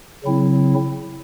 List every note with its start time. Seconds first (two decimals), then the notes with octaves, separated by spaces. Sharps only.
0.24 C#3 F#3 C4 E4